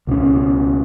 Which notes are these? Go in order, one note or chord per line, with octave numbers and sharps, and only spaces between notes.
C#2 B2 C4 C#4